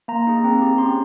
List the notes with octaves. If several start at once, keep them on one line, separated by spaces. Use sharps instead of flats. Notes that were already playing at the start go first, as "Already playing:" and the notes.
A#3 A#5
D#4 G#4
C4
G4
C#4 C6